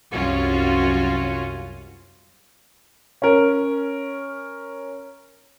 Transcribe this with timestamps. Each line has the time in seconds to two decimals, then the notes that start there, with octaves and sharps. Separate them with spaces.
0.11 C2 F#2 C#4 F4 F#4
3.22 C#4 A#4